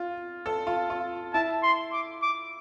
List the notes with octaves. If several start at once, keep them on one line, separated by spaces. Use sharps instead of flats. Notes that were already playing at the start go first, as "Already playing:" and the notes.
Already playing: F4
A4
F4
F4
E4 A5
C6
D6
D6